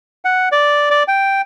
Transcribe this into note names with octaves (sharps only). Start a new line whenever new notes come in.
F#5
D5
D5
G5